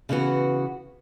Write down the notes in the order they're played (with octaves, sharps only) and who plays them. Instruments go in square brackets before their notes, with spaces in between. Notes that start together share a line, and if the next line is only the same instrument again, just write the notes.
[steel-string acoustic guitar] C#3 E3 B3 F#4